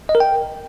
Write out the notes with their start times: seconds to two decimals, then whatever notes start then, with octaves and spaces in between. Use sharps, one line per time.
0.09 D#5
0.15 A#4
0.20 G5